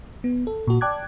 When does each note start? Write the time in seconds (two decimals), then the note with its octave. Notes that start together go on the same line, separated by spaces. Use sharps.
0.24 B3
0.47 A4
0.67 A#2 F#4
0.81 D5 G5 A5 D6 F#6 G#6